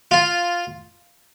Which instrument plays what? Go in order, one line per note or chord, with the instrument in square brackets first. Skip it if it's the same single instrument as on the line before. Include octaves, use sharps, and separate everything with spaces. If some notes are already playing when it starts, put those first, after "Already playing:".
[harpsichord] F4